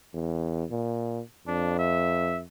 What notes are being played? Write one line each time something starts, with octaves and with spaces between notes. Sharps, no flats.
E2
A#2
F2 D4
E5